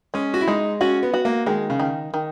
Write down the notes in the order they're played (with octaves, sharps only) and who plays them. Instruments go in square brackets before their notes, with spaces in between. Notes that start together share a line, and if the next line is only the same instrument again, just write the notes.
[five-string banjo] G#3 [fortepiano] C#4
[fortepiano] F#4
E4
[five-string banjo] G#3 [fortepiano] D#4
[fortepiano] C#4 [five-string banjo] F#4
[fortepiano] B3
[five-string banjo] F#4
[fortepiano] A#3
[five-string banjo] D#3 [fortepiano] G#3
[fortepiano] C#3
[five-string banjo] D#3
D#3